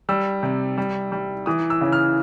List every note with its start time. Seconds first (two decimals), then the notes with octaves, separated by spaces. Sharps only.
0.09 G3 E6
0.43 C3
0.78 G3
1.12 G3
1.46 E3 D#6
1.70 E6
1.81 C#3
1.92 F6